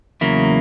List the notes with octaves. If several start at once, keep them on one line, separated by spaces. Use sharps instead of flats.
E2 C#3 F#3 A#3 E4